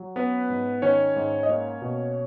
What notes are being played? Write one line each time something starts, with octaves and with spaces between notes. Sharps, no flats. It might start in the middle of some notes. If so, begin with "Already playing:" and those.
Already playing: F#3
B3 C#4 B4
G#2
D#3 C#4 C#5
G#2
D#5
A#3 C#4 C#5
B2